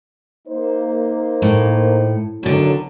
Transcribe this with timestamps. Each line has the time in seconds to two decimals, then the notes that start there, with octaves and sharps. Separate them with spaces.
0.48 A#3 D#4 C5
1.42 A2
2.43 B1 B2 D3 D#3 F#3